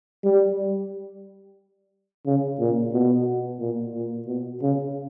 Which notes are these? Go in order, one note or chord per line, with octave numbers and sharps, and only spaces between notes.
G3
C#3
A#2
B2
A#2
A#2
B2
C#3